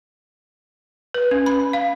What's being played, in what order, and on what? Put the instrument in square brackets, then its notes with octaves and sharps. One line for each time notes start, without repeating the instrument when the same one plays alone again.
[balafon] B4
C#4
B5
F5